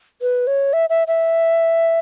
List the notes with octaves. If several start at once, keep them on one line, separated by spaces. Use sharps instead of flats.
B4
C#5
E5
E5
E5